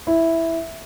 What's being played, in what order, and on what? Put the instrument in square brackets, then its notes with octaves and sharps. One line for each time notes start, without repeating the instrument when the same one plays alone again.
[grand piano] E4